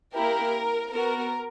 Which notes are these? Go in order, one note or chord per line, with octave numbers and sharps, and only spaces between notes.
A#3 E4 G4 A#4
B3 F#4 A#4